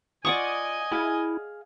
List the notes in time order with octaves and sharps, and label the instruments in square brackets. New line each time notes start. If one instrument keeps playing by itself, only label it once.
[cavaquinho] F4 D#6 [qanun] D5 F#5 C#6 [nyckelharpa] D#5 G#5
[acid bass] E4 [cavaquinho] G#4 F5